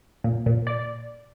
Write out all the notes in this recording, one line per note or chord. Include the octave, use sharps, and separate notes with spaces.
A#2
A#2
D5